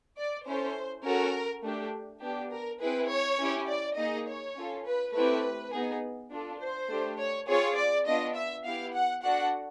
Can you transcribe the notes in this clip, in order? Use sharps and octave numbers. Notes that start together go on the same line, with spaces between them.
D5
C#4 E4 A4 C5
C#4 F#4 A4 A#4
A3 D4 G4
B3 D4 G4
A#4
C4 E4 G#4 B4
C#5
C#4 E4 G4
D5
A#3 D#4 G#4 D#5
C#5
C#4 F4 A4
B4
A3 C4 E4 G4 B4
B3 D#4 G#4
D4 F4 A4
C5
A3 D4 G4
C#5
C4 F4 G#4 C#5
D5
B3 D4 F4 D#5
E5
B3 E4 G4 F5
F#5
D4 F#4 A4 F#5